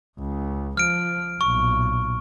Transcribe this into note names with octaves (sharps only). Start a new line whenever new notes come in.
C#2
F3 F6 D7
B1 A#2 C#6